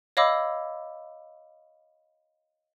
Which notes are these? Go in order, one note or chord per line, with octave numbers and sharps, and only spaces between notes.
C#5 D#5 F5 B5 D6 E6